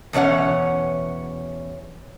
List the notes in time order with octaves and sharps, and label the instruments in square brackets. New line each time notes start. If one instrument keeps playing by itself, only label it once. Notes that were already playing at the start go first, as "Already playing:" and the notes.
[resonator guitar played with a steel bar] E2 B2 C#4 C#5 F#5